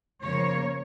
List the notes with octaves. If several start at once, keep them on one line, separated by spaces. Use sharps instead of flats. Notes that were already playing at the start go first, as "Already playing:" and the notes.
C#3 F3 A#3 C#5